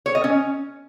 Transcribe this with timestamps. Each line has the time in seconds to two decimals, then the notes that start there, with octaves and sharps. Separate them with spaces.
0.06 C#5
0.15 D#5
0.24 C#4